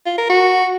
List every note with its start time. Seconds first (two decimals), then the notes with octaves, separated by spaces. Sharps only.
0.06 F4
0.18 A#4
0.30 F#4